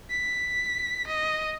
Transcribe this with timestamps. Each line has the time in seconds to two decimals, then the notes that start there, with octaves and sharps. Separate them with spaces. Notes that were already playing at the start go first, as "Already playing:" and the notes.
0.11 B6
1.07 D#5